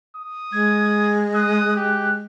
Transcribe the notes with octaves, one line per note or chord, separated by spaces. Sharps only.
D#6
G#3 G#6
D#6 F#6
G4